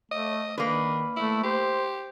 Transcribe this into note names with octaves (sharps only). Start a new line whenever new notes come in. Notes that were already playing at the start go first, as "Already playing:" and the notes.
A3 D#5
D#3 A#3 D4 B4
A3 E4
G4 C5